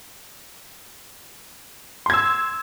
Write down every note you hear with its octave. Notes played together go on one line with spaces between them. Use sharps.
C6 E6 G#6